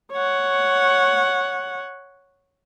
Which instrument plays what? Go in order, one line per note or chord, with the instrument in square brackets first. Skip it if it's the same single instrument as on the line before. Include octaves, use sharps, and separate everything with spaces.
[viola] C#5 F#5